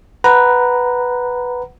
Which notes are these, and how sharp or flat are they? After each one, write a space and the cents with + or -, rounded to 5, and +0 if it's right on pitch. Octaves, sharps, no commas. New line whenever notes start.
B4 +0 F#5 +5 A#5 +0